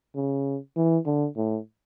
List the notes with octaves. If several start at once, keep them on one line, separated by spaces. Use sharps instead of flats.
C#3
E3
D3
A2